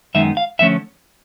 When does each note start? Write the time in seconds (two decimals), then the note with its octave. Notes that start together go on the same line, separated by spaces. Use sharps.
0.14 F#2 D#3 G#3 B3 D#4 E5
0.37 F5
0.59 D3 F3 A3 C#4 E5